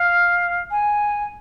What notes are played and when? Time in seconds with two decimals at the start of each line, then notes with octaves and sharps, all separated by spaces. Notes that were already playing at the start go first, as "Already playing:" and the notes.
Already playing: F5
0.71 G#5